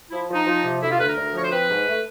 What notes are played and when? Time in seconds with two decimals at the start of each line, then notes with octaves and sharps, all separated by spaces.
0.11 F3 E4
0.29 F3
0.34 D#4
0.46 F3
0.63 C3
0.81 D2 E4
0.90 F4
0.98 D2 B4
1.08 A#4
1.16 D2
1.34 F3 C#5
1.43 C5
1.51 C4 B4
1.69 G#2
1.86 A3